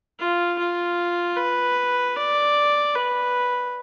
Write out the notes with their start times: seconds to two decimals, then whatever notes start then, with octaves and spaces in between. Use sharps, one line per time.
0.19 F4
0.59 F4
1.37 B4
2.17 D5
2.96 B4